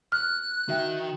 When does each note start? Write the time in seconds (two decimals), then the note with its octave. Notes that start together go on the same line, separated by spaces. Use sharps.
0.12 F6 F#6
0.69 D#3 F#4 E5 G5